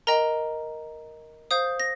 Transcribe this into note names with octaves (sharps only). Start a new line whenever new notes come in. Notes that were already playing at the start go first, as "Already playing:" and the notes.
A#4 D#5 G5 A#5
C5 F5 D#6 G6
A#6